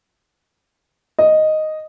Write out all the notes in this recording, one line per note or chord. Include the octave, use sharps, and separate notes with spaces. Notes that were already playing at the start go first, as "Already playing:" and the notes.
D#5